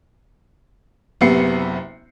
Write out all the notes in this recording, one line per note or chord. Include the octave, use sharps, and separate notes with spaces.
F#1 C3 B3 C7 C#7